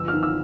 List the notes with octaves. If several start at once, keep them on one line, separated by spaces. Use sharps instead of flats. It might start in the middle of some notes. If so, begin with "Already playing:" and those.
Already playing: G1 F3 E6
D#3 F6
E6